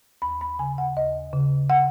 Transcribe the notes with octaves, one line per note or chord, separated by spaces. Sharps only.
D#2 B5
B5
C#3 G#5
F#5
D#2 D#5
C#3
F#5